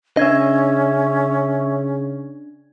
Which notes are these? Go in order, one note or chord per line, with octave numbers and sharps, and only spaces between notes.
C#3 C#4 D4 D#5 E5 G#6